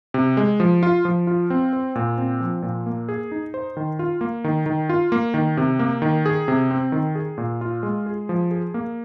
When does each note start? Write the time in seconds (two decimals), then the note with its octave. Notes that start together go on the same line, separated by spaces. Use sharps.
0.14 C3
0.37 G#3
0.60 F3
0.83 F4
1.05 F3
1.27 F4
1.50 C4
1.73 C5
1.95 A#2
2.18 C4
2.41 F3
2.62 A#2
2.86 A#3
3.09 G#4
3.31 D#4
3.54 C5
3.77 D#3
3.99 F4
4.21 A#3
4.44 D#3
4.66 D#3
4.89 F4
5.12 A#3
5.34 D#3
5.57 C3
5.79 A#3
6.02 D#3
6.26 G#4
6.48 C3
6.71 C4
6.92 D#3
7.15 G#4
7.38 A#2
7.61 F4
7.83 G#3
8.06 G#4
8.29 F3
8.51 G#4
8.74 A#3